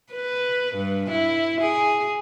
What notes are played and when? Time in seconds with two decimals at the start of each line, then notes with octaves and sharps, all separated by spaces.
0.13 B4
0.76 G2
1.11 E4
1.61 G#4